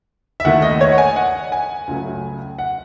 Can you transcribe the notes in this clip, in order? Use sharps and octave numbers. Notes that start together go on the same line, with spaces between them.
E5
D#2 D#3 A3 F#5
D#5
C#5
F#5
G#5
F#5
G#5
C#2 C#3 F#3 A3
F#5